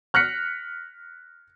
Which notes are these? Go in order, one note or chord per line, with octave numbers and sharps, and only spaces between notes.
F6 F#6 A#6 B6 C#7